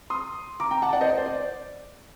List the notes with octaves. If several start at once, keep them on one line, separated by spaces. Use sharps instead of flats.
C6 D#6
A#5 D6
G5 A#5
F#5 A5
D5 F#5
C5 D#5
D5
C5
D5